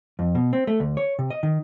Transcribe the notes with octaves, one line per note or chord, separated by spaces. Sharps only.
F2
B2
C4
A3
D2
C#5
C3
D#5
D#3